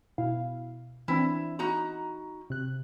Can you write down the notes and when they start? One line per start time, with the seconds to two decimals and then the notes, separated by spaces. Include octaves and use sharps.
0.18 B2 E4 F5
1.08 E3 C4 D4 E4
1.59 D#4 F#4 A#5
2.50 C3 F#6